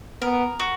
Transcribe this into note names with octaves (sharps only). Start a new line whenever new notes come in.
B3 A#4
F#4